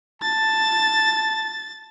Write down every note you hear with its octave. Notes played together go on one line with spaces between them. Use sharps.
A5 A6